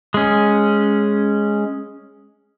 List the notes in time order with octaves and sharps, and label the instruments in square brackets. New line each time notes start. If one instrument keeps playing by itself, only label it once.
[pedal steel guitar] G#3 C#4